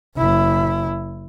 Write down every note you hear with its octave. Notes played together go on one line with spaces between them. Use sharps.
F#1 E4